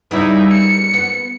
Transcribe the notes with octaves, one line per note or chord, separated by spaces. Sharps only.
C#3 G3 B3 D#4 E4
C#7
B3